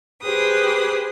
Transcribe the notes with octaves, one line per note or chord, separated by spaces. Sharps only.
G4 G#4 B4 C5 D#6